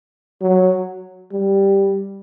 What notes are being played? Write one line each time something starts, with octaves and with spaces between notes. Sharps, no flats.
F#3
G3